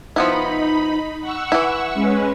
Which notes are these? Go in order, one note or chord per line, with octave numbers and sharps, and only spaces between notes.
F3 B3 D#4 E4 B5
F#5 C#6 E6
E3 E4
G#3 C#4 B4